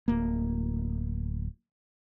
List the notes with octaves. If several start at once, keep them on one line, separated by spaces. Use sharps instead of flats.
D1 A#3